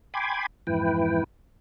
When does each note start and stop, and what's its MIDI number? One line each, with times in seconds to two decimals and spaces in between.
0.14 0.46 79
0.14 0.46 80
0.14 0.46 83
0.14 0.46 84
0.14 0.46 86
0.14 0.46 92
0.67 1.24 41
0.67 1.24 44
0.67 1.24 52
0.67 1.24 64
0.67 1.24 71
0.67 1.24 79